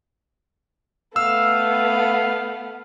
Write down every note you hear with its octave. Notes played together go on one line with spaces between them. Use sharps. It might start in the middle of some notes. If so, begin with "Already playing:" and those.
A3 B3 F5 E6